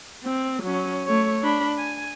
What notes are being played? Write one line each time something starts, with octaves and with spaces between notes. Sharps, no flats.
C4
F#3 C#4
A3 C#5
D4 B5
G#5